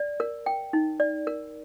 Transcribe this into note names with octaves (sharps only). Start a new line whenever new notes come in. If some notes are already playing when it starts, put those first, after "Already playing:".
Already playing: D5
A#4
G5
D#4
D5
A#4